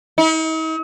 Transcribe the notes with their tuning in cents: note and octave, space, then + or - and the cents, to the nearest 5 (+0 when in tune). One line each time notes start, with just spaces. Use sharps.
D#4 +45